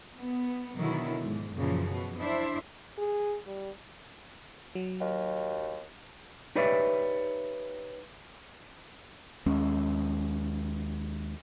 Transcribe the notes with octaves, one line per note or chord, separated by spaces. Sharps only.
B3
B2 D3 D#3 F#3 E4
G#2
F#2 A#2 C#3 E3 F3
B2
D4 E4 C5 E5
G#4
G3
F#3
D#2
D#4 G4 B4 C#5 D5 E5
D#2 G#3 C#4